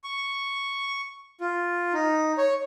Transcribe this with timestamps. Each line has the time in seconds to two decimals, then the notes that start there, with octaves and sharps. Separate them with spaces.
0.04 C#6
1.41 F4
1.93 D#4
2.38 C#5